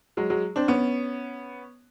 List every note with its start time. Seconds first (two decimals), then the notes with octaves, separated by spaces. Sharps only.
0.17 F#3 G#3
0.30 F#3 G#3
0.56 C4 D4
0.68 B3 C#4